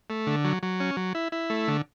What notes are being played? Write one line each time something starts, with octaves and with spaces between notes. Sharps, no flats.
A3
D3
F#3
F#3
C#4
F#3
E4
E4
A3
D3